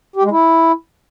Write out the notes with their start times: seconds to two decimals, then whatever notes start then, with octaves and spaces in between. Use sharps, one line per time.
0.16 G4
0.23 G#3
0.31 E4